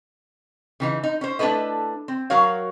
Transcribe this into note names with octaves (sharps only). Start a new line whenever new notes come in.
C#3 E3 D#4
D#4
C#4 C5
A3 D4 E4 A4 B4 D#5
C4
F#3 F#4 A#4 C#5 F5